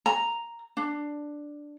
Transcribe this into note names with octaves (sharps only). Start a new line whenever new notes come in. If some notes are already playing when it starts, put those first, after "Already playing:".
A#5
D4